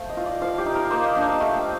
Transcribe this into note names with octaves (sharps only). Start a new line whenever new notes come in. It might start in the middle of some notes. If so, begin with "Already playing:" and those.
Already playing: A3 C4 F5
D#5
F4
D5
F3 F5
G4
D#4
A#4
A#3 C5
D#5
D4 F5
D#5
A3 F5
G5